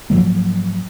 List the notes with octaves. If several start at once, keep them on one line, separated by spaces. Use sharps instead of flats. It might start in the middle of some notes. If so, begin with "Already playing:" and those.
G#2 F3 F#3 A#3